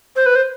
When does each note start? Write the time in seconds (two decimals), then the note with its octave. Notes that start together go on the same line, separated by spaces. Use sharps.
0.16 C5
0.26 B4
0.35 C5